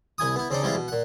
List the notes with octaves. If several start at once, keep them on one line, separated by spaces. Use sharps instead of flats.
C2 E4 G#5 D#6
B3 E4
C#3 C4 D4 D#4
C3 E3 G3 G#3 C4 F4
B2
A#2 F#5